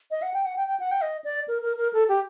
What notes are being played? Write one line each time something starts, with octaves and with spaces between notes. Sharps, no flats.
D#5
F#5
G5
F#5
G5
G5
F#5
G5
D#5
D5
A#4
A#4
A#4
A4
G4